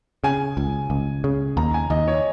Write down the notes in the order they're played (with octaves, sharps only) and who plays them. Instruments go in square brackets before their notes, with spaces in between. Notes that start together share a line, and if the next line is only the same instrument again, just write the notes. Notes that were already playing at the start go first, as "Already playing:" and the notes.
[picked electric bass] C#3 [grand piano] G#5
[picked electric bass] C#2
C#2
C#3
[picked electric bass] D#2 [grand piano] A#5
[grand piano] G#5
[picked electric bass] D#2 [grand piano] D#5
[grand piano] C#5